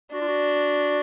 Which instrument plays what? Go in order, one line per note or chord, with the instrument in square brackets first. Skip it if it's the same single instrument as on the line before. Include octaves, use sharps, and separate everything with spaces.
[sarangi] D4 [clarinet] F#4
[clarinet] F4
F#4